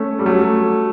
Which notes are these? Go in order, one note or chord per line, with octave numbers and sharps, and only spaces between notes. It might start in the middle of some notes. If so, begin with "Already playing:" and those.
Already playing: A3 C#4
G3
F#3 A3